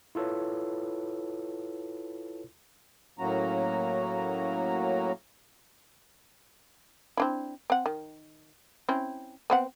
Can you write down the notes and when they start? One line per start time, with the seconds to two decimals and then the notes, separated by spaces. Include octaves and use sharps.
0.15 E4 F4 A4 B4 C#5
3.19 A2 F#3 A#3 C#4 F#4 A#5
7.17 C4 D4 E4
7.70 C4 F#5
7.86 D#3
8.89 C4 C#4 E4
9.50 B3 C4 F#5